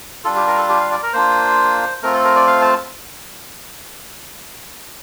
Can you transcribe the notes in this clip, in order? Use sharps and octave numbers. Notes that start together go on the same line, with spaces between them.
G3 D4 F4 A4
G4
A#4
A4
G4
F5
D5
A#4
A#3 D4 F4 C5
A3 C4 F4 A#4
A4
A#4
D5
F5
A5